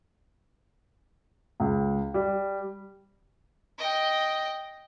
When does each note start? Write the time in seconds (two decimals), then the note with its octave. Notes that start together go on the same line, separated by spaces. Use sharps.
1.60 C#2
2.14 G3
3.79 D#5 G5